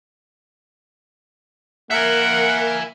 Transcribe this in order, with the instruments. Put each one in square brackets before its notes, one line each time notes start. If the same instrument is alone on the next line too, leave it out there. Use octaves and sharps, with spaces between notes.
[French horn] A#3 [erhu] A#4 [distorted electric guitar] E5 G#5 [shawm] F#5